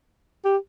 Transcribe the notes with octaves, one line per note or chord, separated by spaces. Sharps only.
G4